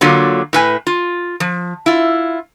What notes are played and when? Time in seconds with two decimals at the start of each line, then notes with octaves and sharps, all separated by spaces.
0.01 D3 F#3 A#3 F4
0.53 A2 B4 G#5
0.87 F4
1.40 F3
1.86 E4 F4